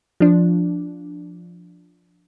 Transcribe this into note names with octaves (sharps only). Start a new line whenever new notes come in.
F3 D4